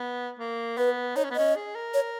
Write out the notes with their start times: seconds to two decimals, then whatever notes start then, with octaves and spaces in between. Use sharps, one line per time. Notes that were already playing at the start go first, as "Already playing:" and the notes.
Already playing: B3
0.39 A#3
0.78 B3 B4
1.16 D#4 C#5
1.24 C#4
1.31 B3
1.35 C#4 D#5
1.56 G#4
1.75 A#4
1.94 C#5